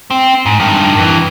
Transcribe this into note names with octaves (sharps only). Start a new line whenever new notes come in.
C4
G#2
G2 D#3
G2 E3